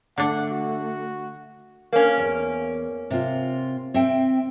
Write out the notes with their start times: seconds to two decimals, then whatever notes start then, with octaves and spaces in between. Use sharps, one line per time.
0.18 D3 A3 D4 F#5
0.51 F#4
1.93 A#3 C#4
2.17 E2
3.11 C3 F4
3.94 C4 E5 G5